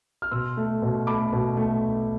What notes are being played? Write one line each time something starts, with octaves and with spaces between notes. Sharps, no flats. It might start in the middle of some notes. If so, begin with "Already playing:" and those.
F6
B2 C6 E6
A3
B2
A3 B5 D6
B2
A3